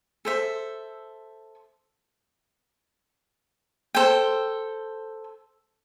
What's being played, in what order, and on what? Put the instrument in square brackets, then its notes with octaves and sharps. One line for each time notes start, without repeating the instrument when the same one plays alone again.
[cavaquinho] A4 C5 E5
A4 C5 G5